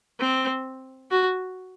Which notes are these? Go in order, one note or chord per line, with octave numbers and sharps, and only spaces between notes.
C4
F#4